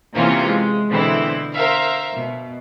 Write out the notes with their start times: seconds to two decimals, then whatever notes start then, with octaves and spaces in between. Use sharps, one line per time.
0.15 C3 E3 A#3 C4 C#4 F4
0.44 G#3
0.89 B2 D3 E3 B3 C4 E4
1.53 A#4 C5 E5 F5
2.15 B2